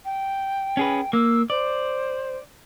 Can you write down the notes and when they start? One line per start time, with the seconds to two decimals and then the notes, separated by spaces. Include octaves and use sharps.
0.05 G5
0.77 C#4 G#4 B4
1.13 A#3 E6
1.50 C5 D5